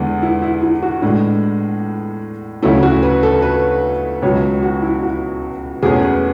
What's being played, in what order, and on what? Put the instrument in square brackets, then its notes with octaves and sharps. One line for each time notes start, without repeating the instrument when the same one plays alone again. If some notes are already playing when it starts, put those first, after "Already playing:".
Already playing: [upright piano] E2 D3 G#3 B3
E4
E4
E4
F#4
A2 E3 G#3 D4
D2 C#3 F#3 A3 C#4 E4
F#4
B4
A4
B4
C#2 B2 F#3 C#5
F#4
E4
F#4
E2 B2 A3 C#4 G#4
B4